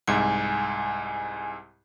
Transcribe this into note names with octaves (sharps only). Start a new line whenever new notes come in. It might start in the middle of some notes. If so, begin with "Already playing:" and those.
C2 G#2 G#5